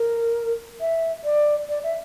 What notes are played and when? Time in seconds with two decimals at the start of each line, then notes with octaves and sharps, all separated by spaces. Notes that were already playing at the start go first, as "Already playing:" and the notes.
Already playing: A#4
0.81 E5
1.24 D5
1.69 D5
1.84 E5